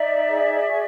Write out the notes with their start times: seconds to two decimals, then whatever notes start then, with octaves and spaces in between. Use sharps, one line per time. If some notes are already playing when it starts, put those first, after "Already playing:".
Already playing: D#4 D5 E5
0.27 G#4
0.65 F#4